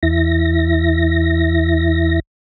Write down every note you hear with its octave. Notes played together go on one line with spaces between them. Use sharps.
E2 E4 A#6